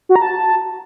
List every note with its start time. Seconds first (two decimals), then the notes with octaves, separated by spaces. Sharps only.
0.09 F#4
0.16 A#5
0.22 A5